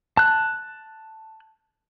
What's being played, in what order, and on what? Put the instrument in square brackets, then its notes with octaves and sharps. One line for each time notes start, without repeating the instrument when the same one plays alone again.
[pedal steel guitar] A5 F#6